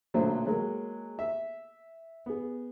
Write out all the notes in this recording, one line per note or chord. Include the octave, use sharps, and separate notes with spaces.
B1 A#2 D3 F#3 A3 C5
F#3 G#3 A#3
E5
B3 G#4